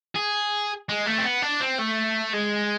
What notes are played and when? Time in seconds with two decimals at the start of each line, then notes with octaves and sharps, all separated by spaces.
0.16 G#4
0.89 G#3
1.06 A3
1.18 C4
1.25 B3
1.42 D4
1.61 C4
1.79 A3
2.34 G#3